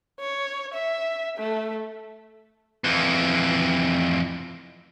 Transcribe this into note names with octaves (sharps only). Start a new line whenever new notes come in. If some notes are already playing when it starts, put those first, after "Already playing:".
C#5
E5
A3
F2 E3